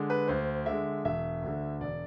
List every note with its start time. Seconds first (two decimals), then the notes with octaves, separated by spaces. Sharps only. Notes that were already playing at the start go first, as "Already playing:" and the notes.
Already playing: D3 G#3
0.10 B4
0.28 D2 C5
0.66 D3 G#3 E5
1.05 E1 E5
1.42 D2 D3
1.80 E1 D5